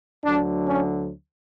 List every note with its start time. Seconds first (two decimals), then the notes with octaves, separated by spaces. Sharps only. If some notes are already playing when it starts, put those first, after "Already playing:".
0.25 D2 D3 F#3 D4
0.67 C#4